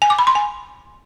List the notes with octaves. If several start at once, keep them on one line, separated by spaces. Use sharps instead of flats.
G#5
D6
B5
C6
G#5